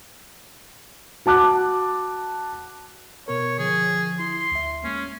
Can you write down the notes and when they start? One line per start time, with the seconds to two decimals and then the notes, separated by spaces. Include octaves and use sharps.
1.26 F#4 A5 D6 F#6
3.28 B2 B3 A#4 C#5
3.59 D3 F3 G#4
4.19 E4 C6
4.51 D2 E5
4.84 G#3 A#3 C#4